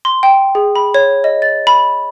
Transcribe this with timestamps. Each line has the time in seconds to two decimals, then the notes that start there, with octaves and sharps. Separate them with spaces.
0.05 C6
0.23 G5
0.55 G#4
0.76 B5
0.94 C#5
1.24 D#5
1.42 A6
1.67 B5